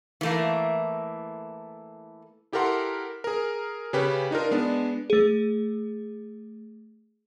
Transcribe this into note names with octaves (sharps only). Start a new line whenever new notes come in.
E3 A3 A#3
E4 G4 A4 A#4 F#5 C6
G#4 A#4
C#3 C#4 G4 B4
D4 D#4 F4 A#4
G#3 B3 D4
A3 G#4